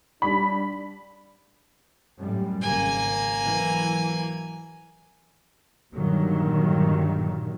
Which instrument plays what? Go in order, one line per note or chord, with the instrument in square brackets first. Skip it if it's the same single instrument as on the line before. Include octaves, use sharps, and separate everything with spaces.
[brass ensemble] G3 D4 [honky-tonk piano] B5
[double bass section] F#2 A2 G3
[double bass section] G#1 C#3 [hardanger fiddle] A#3 G#5
[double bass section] E3 F#3
G2 A#2 D3 D#3 F#3